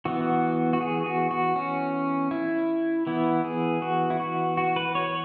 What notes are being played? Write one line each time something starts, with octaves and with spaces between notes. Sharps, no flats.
E3 B3 F#4
F#4
G#4
F#4
F#4
C#4
E4
E3 B3 E4
G#4
F#4
E4
F#4
F#4
B4
C#5